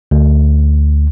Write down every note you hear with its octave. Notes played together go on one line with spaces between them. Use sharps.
D2